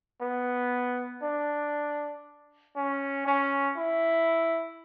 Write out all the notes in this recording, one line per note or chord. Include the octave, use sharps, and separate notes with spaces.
B3
D4
C#4
C#4
E4